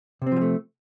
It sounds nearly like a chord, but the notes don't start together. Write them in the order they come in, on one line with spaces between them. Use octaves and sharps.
C3 C4 F3 G3 A3